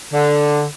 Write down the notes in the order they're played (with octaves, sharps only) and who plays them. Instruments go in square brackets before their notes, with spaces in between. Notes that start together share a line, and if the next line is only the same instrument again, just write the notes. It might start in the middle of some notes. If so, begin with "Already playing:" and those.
[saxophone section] D3